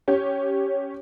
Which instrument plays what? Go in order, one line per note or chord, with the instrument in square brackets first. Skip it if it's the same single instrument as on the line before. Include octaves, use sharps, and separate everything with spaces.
[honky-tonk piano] C#4 G4 C#5